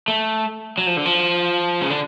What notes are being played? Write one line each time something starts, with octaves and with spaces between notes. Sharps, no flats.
A3
F#3
F3
D3
F3
C#3
D3